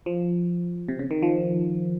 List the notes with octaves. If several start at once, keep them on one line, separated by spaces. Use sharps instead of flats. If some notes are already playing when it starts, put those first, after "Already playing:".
F3
C3
C#3
D#3
F3